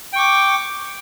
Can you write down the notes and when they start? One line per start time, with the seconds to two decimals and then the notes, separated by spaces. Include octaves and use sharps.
0.13 G5
0.16 C#6
0.19 D6